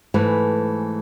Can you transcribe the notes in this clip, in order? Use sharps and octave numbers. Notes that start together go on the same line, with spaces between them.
G#2 E3 A3 B4 G#5